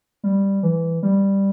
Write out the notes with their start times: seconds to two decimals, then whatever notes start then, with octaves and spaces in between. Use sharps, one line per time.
0.23 G3
0.63 E3
1.03 G3